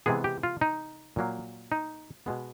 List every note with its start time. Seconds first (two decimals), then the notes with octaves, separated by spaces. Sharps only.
0.06 C3 E3 G#3 B3 G#4
0.24 G4
0.43 F4
0.61 D#4
1.16 A#2 F#3 A#3
1.72 D#4
2.26 B2 G#3 B3